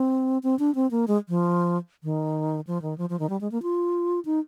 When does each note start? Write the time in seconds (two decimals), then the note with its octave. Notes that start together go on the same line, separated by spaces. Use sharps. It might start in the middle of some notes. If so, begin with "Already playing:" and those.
Already playing: C4
0.43 C4
0.59 D4
0.75 C4
0.91 A#3
1.08 G#3
1.29 F3
2.03 D#3
2.67 F3
2.82 D#3
2.98 F3
3.09 F3
3.19 D#3
3.29 G3
3.41 G#3
3.52 A#3
3.62 F4
4.25 D#4